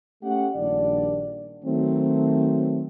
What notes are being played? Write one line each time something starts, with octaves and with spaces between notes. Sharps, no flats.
A3 C#4 G4 F#5
A#1 D#3 G3 D4 D5
D#3 F#3 A3 C4